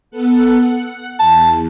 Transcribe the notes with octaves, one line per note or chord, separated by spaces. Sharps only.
B3 A4 F#5
F#5
E2 A5